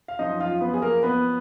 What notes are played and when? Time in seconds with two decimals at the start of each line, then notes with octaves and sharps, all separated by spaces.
0.08 F5
0.19 F#2 F3 D#4 D#5
0.40 F4 F5
0.61 B3 B4
0.74 G#4
0.81 A#3 A#4
1.03 B3 B4